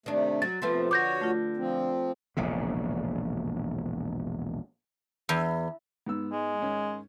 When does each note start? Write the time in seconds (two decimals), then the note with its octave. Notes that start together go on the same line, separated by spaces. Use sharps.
0.06 C3 D#3 A3 D4
0.42 F#3 A6
0.62 C3 F3 A3 B3 F4 B4 C6
0.91 D3 F#4 C#5 D6 G6 A#6
1.21 A3 F4
1.57 F3 C4
2.37 E1 A#1 A2 C#3
5.29 E2
6.06 G#2 B3 E6
6.32 G#3
6.62 G#2 D#3 C#4